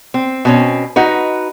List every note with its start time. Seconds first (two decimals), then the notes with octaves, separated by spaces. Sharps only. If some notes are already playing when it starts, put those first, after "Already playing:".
0.14 C4
0.45 B2 C4 C#4
0.96 D#4 F#4 B4